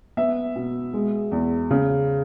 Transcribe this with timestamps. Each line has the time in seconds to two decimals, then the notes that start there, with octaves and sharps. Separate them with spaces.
0.17 B3 E5
0.56 B2
0.93 G#3
1.32 E2
1.70 C#3